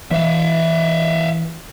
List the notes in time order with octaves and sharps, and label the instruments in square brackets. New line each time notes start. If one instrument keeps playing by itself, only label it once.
[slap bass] E3 [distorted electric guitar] E5 F5